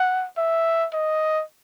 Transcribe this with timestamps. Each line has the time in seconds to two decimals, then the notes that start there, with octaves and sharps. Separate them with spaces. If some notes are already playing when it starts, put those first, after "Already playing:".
Already playing: F#5
0.38 E5
0.93 D#5